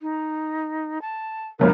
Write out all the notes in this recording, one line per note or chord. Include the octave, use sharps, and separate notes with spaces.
D#4
A5
C#2 F#2 D3 A#4